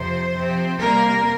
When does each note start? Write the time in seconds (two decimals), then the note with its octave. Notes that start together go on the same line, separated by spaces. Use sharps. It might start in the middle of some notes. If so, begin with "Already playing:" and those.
Already playing: F2 C3 F3 C5
0.34 C3 F3 C4
0.79 C3 G3 A#3 A#4